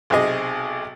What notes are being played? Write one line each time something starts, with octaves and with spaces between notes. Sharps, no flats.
B1 C3 G#4 D#5